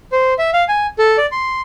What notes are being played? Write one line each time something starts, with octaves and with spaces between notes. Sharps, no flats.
C5
E5
F5
G#5
A4
D5
C6